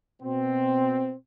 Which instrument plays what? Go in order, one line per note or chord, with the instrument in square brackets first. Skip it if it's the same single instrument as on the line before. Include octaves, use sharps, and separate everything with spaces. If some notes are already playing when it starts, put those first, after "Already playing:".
[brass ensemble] B2 C4